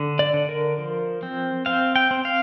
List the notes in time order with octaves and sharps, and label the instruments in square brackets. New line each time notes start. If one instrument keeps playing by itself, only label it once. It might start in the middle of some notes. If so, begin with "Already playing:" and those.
Already playing: [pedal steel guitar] D3
D5
D3
A#4
F3
C4
C4 F5
G5
C4
F5